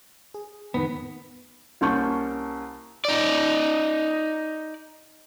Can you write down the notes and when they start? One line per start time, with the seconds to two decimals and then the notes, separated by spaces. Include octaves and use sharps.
0.34 G#4
0.74 F2 A2 D#3 B3
1.81 C2 A#3 C#4 A5 C#6 G6
3.05 D#4 D5